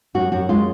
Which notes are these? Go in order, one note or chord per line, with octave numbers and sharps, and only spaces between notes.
F#2 F#4
F#2 F#4
G#3 F4